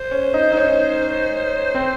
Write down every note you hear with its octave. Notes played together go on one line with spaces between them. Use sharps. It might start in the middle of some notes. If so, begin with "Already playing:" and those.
Already playing: C5
C#4
D#4
D#4
C#4
C4